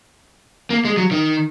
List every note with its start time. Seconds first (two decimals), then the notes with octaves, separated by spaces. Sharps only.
0.70 A#3
0.85 G#3
0.97 F#3
1.11 D#3